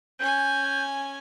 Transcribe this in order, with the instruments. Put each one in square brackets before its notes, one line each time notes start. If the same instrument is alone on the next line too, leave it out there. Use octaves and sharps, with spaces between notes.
[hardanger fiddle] C#4 G#5 [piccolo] G6